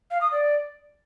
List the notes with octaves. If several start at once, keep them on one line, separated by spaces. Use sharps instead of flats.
F5
D#6
D5